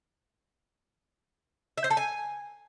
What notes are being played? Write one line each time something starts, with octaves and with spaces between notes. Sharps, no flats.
E5
C5
A4
G#5